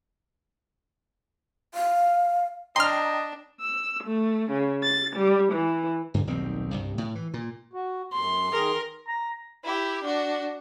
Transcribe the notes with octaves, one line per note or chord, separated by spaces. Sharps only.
F5
D4 D#5 G5 A#5 C6 F6
E6
A3
C#3
A6
G3
E3
G2 D3
D#1 B1 D#3 C4
C2 G2
A2
E3
A#2
F#4
F#2 C6
D#3 G#4 A#4
A#5
E4 G4
D4 F#4